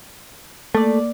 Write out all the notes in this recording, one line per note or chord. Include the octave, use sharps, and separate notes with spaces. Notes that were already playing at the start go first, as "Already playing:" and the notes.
A3 A#3 D5